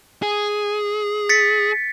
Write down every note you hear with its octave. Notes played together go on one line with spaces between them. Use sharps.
G#4
A6 B6 C#7